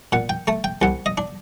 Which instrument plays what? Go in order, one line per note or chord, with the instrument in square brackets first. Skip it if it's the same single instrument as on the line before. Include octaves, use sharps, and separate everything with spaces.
[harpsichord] A#2 F#5
G5
A3 A5
G5
C2 F#5
D#5
D4